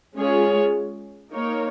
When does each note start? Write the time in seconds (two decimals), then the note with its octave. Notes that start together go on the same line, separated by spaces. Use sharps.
0.16 G#3 C#4 F4 G#4 C#5
1.31 A#3 D#4 A#4 C#5